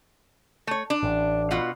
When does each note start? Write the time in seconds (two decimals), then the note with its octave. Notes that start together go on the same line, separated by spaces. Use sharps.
0.67 A3 C#5
0.90 D4
1.03 A1
1.51 B2 F4 F#5